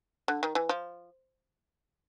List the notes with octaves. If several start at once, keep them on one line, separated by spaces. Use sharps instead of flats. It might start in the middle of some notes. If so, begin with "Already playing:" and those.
D3
D#3
E3
F3